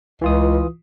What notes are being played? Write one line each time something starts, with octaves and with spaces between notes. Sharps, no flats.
C#2 E3 F4 D#6